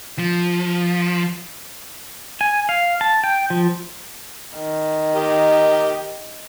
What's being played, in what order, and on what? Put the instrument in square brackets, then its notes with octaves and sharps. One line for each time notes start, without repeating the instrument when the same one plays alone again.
[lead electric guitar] F3
[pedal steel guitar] G#5
F5
A5
G5
F3
[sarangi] D#3
[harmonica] G4 A#4 D#5